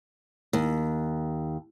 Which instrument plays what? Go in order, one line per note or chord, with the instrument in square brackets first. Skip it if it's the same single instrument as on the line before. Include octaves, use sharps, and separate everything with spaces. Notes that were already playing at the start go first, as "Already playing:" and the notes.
[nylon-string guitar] D#2